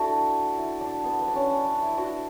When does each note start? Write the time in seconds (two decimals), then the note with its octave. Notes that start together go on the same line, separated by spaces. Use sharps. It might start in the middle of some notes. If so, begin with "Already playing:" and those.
Already playing: D4 E4 F#4 A4
0.58 E4
0.81 D4
1.04 B3
1.19 B3
1.28 D4
1.36 C#4
1.51 D4
1.66 D4
1.82 E4
1.97 D4 F#4